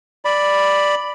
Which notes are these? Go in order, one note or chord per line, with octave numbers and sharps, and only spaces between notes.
D5 B5